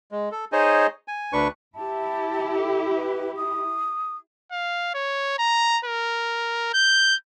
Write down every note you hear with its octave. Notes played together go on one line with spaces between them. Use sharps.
G#3
A4
D#4 G#4 C5 C#5 D#5 G#5
G#5
D2 D4 B4 C#6
E4 G4 A5
A4
B4
D#6
F5
C#5
A#5
A#4
G6